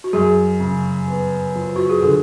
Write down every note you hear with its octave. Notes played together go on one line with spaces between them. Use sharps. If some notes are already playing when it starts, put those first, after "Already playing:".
F#4
F#2 G#4
C#3
B3
F3
F#4
G#4
D3 A4